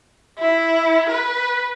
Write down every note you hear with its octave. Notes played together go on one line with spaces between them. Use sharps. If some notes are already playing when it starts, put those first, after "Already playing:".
E4
B4